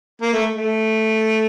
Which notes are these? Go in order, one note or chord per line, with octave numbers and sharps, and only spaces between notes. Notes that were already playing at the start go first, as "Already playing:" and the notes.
A#3
A3
A3